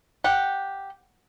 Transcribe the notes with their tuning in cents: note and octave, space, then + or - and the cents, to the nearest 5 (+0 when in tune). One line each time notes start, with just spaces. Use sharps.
G4 +0 F#5 -10